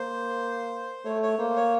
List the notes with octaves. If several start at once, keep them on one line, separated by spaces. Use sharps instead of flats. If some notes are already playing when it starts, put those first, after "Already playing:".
Already playing: A#3 C5
A3 C#5
C#5
A#3 C5
C#5